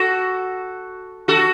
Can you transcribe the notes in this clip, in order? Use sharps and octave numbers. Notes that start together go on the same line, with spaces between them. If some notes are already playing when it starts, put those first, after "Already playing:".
Already playing: F#4 A4
F#4 A4